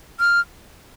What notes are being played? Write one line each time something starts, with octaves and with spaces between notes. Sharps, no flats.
F6